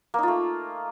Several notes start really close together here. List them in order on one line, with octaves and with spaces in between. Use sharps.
A#3 D#4 F4 A3